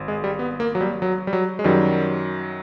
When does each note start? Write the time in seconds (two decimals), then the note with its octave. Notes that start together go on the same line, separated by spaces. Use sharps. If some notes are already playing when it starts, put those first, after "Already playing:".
Already playing: G#1
0.08 G#3
0.24 G3
0.39 B3
0.60 A#3
0.75 F#3
0.81 G3
1.02 F#3
1.27 G3
1.33 F#3
1.59 G#3
1.64 F#2 D#3 F#3 G3